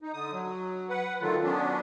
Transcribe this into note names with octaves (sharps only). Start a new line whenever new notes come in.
D#4
D3 D#6
F#3
B4 F#5
D3 D#3 F#3 A3 F4
F#3 B3 C#4 D4